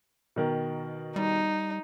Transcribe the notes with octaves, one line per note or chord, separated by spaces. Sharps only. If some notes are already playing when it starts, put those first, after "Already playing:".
B2 D#3 A#4
G3 D#4